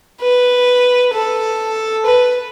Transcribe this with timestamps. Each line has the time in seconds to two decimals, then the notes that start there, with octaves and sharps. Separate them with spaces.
0.21 B4
1.13 A4
2.06 B4